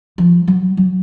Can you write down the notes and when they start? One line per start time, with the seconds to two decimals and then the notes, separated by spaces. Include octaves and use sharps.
0.18 F3
0.47 F#3
0.77 F#3